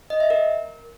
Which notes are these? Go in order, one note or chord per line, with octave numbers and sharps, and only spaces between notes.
D#5
E5
A#4